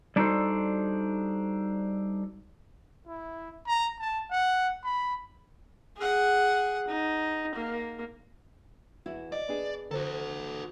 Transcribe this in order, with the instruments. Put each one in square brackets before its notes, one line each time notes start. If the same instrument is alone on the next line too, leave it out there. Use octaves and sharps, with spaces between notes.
[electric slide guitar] G3 D4 D#4 F#4 A4 C5
[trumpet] E4
A#5
A5
F#5
B5
[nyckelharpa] G#4 F#5
D#4
A#3
[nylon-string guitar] E2 E4 F#4
[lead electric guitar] D5 [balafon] D#5
[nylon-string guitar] B3 D4 G#4
[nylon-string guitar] F2 [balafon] D3 C5 [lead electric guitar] F#4 A4